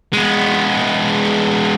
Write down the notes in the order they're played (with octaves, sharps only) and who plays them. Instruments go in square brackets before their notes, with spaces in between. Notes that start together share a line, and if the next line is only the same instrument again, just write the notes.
[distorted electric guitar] G#3 B3